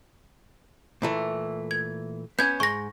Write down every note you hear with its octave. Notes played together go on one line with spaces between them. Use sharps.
A#2 E3 A3
G#6
B3 C#4 G6 G#6
G#2 C#6 A#6